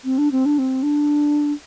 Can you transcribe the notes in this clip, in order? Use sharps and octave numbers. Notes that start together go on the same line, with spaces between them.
C4
D4
C4
D4
C4
D4